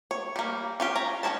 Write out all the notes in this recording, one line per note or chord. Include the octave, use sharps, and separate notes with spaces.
C#5
G3 A#3
C#4 F4 G4
C#5 A#5
D#3 C#4 E4 C#5 A5